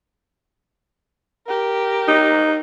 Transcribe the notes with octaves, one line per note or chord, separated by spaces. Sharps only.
G4 A#4
D#4